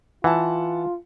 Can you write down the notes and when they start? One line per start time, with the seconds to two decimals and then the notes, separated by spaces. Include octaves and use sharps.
0.24 E3 F4 F#5 A5